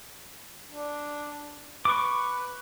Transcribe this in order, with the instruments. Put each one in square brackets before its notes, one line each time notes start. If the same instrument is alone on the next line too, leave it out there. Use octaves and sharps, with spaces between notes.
[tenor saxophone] D4
[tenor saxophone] B4 [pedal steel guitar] C#6 D6